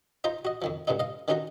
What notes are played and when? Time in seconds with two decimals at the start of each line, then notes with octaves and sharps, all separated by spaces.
0.24 D#4 F4 C5 A#5 C6
0.45 F#4 D#5
0.62 F2 D#3 F3
0.87 C#2 G2 A#2 D3 D#4
0.99 D#5 F5
1.28 D3 D#3 C#4 D#4 F#4 A#4